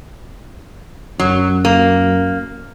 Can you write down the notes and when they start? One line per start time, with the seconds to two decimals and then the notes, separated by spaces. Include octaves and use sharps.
1.19 F#2 F#3
1.65 A#3